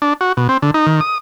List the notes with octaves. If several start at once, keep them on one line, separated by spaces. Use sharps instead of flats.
D4
F#4
B2
C4
D3
D#4
D#3
D#6